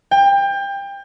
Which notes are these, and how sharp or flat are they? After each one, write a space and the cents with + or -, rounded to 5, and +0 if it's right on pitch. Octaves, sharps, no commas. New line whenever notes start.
G5 +25